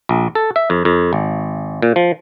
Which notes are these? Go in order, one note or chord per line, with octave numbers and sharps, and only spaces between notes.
A#1
A4
E5
F2
F2
G#1
A#2
F3